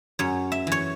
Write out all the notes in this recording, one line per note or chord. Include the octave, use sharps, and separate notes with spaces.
F#2 C#5
E5
E3 C#5